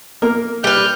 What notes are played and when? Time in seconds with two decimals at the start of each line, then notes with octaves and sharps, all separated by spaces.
0.22 A#3 A#4
0.64 G3 B4 F6 G6